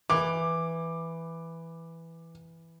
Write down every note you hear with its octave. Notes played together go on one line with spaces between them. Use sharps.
E3 D6